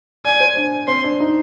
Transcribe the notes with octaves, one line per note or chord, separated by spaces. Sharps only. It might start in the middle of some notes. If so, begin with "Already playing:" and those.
D5 G#5
C5
D4
C4 C6
D4
D#4